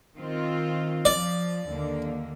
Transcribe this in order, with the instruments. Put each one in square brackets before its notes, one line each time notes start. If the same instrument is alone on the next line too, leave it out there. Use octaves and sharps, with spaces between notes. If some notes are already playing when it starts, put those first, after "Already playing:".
[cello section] D#3 C4 F4
[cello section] F3 [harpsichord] D5
[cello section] D#2 D3 A#3